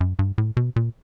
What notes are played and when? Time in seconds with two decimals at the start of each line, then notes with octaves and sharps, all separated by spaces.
0.01 F#2
0.19 G2
0.38 A2
0.57 B2
0.76 A#2